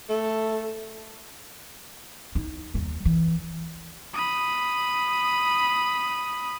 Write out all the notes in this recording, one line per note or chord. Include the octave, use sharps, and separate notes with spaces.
A3 A4
D#4 E4
D#2 G3
E3
B5 D#6